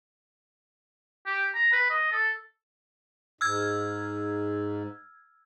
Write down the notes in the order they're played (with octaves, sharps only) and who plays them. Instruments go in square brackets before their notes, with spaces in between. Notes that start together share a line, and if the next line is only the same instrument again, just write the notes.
[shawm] G4
A#5
B4
D#5
A4
[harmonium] G#2 [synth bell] E6 F6 G#6